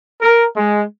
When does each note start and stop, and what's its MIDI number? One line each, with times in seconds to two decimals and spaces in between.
0.22 0.44 70
0.56 0.81 56